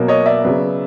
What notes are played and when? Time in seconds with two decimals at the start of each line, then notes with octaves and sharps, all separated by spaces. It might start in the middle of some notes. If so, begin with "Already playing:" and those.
Already playing: B2 F#3 A#3
0.08 C#5 D#5
0.26 D5 E5
0.44 C#3 F#3 B3